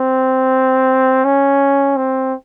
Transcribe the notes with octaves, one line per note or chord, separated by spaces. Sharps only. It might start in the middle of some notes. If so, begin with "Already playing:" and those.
Already playing: C4
C#4
C4